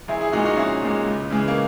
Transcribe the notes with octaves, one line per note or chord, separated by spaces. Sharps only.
A#1 E4 G#4
E4 G#4
A#2 G#3 D#4 F#4
D#4 F#4
A#1 C#4 E4
A#2 G#3
C#2
C#3 E3 G#3
A#3